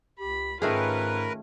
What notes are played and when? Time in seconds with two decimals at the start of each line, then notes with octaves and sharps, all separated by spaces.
0.20 C#2 G4 B5
0.62 G#2 D#3 A3 C#4 F4 G#4 A#4 B4